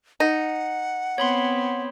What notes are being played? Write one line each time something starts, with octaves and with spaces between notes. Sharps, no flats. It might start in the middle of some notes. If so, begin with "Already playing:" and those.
D#4 F#5
B3 C4 C#5 B5 C6